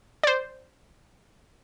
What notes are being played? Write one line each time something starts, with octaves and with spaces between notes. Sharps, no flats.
C5 D5